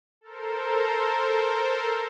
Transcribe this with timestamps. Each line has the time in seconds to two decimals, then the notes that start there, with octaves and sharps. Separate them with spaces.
0.21 A4 A#4 C5